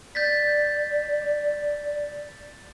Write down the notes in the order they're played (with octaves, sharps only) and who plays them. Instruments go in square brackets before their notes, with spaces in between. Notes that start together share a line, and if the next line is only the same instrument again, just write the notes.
[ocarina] D5 [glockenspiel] G6 A6 B6